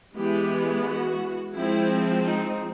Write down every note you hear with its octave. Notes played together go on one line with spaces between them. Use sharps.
E3 G#3 B3 G4
F#4
F3 G#3 C4 E4
D#4